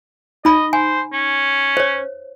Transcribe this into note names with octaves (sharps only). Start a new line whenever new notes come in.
D#4 D#5 B5
C5 G#5
C#4
C5 C#5